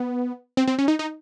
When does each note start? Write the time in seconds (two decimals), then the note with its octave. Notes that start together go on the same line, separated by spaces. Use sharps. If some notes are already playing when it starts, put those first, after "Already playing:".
Already playing: B3
0.57 C4
0.68 C4
0.79 C#4
0.88 D#4
0.99 D#4